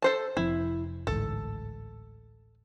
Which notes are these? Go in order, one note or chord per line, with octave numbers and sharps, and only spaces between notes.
A4 C5 A5
F1 F3 C4 E4
A1 D2 G#2 A4